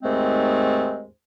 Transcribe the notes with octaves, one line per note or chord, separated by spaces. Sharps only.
D#2 G#2 G#3 A3 C4